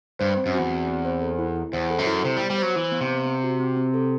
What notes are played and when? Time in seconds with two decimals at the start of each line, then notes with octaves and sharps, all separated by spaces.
0.20 G2 C5
0.37 C4
0.46 F#2
0.54 E2 F#4
0.71 C4
0.87 C4
1.05 C5
1.21 A4
1.39 E4
1.56 E4
1.73 E2 C5
1.90 A4
1.98 F#2
2.07 E4
2.24 C3 C5
2.37 G3
2.41 B3
2.50 G3
2.58 F#3 C5
2.76 E3 C5
2.92 B3
3.01 C3
3.10 C5
3.26 C4
3.44 F#4
3.60 C4
3.77 C4
3.94 A4